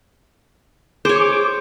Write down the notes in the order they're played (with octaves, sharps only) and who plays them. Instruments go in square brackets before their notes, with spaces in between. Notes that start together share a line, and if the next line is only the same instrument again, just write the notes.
[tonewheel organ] G#4 D6 [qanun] C5 C#5